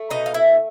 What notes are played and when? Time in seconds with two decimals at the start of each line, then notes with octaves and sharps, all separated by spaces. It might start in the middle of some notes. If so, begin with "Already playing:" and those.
Already playing: A3
0.10 B2 D#4 D#5
0.26 F5
0.34 E4 E5